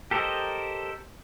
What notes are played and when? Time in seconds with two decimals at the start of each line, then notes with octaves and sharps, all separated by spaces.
0.11 G4 A4 A#4 C5 D#5